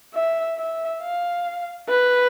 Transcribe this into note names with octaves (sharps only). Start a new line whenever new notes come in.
E5
E5
F5
B4